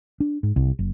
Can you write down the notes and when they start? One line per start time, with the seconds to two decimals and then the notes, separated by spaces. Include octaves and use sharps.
0.20 D4
0.43 G#2
0.56 C2
0.79 F#1